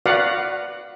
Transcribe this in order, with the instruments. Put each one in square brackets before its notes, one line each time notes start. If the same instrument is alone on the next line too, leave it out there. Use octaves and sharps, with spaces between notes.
[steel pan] F#4 B4 D5 F5 F#5